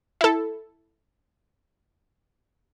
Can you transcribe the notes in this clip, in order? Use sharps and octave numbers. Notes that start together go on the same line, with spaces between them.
E4 A4